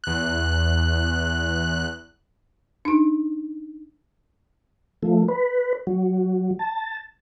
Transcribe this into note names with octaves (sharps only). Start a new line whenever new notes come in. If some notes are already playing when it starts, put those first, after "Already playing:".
E2 F#6
D4 D#4
F3 A3
B4
F#3
A5